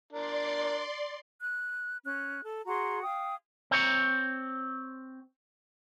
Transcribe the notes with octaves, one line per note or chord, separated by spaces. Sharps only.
D4 A#4 D5 C6
F#6
C#4 F#6
A4
F#4 G#4 A#5 C6
F5 G5 D#6
C4 C#5